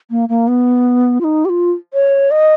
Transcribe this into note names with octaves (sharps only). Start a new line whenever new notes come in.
A#3
A#3
B3
F4
D#4
G4
F4
C#5
D#5